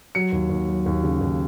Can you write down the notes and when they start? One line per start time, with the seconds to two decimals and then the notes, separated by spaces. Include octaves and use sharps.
0.15 F#3 C#7
0.32 D#2
0.50 D#2
0.68 F#3
0.86 D#2
1.04 C#3
1.21 D#2